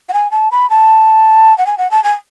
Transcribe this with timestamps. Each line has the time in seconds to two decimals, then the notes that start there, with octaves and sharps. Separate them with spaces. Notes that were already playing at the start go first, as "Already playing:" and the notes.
0.09 F#5
0.13 G#5
0.31 A5
0.52 B5
0.70 A5
1.58 F#5
1.67 G#5
1.78 F#5
1.91 A5
2.04 G#5